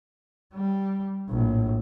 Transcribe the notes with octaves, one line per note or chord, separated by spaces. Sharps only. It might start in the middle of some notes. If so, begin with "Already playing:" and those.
G3
A#1 A2